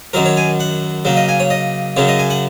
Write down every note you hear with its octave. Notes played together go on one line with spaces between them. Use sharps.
F#2 D#3 F#3 A#4
C#5
G#5
F#5
C#3 F#3 A#3
D#5
G#5
C#5
D#5
F#2 C#3 F#3 C#5
D#5
G#5
F#5